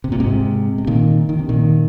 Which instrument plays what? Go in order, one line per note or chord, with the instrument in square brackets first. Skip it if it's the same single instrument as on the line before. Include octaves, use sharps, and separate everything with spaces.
[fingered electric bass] C3
A#2
G#2 C3
C3
A#2 D#3
D#3
C3
A#2 D#3